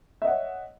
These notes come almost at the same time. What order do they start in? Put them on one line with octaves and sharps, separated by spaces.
E5 D#5 F#5 C#5